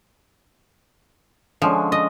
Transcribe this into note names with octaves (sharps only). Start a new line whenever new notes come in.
D3 F3 G#3 C#4
D#5